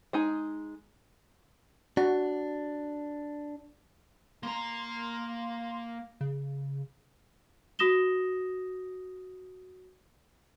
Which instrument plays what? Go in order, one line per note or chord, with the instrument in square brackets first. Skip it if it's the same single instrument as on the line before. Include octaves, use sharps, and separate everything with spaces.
[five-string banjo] G#3 D#4 G#5
[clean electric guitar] D4 [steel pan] F#4
[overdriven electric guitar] A#3 A#5 [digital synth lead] C6
[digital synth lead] C#3
[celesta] F#4 D#6 A#6 E7 G7